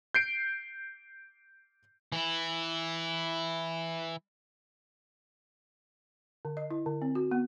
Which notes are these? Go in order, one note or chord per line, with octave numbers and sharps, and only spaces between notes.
G6 C7 D7
E3 E4
D3
D#5
E4
D3
C4
F#4
B3